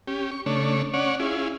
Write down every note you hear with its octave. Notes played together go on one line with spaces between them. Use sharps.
C#4 G4
C#6
C#3 A3 D4 C#5
C#4 C#5 D5 F#5
C#4 E4 F4 G#4